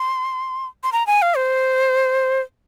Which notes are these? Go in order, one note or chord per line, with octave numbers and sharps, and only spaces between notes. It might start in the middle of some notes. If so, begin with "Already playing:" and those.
Already playing: C6
C6
A#5
G#5
F5
C5